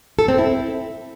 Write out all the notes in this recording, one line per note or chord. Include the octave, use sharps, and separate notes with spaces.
A4
C4
E4